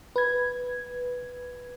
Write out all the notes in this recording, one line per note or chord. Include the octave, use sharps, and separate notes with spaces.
B4 G#6